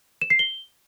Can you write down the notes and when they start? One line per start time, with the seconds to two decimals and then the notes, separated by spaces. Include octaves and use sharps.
0.22 E7
0.30 C7
0.39 G7